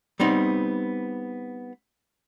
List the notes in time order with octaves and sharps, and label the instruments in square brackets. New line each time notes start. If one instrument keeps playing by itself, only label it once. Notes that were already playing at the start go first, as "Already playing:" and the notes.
[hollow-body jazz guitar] G3 B3 C4 D#4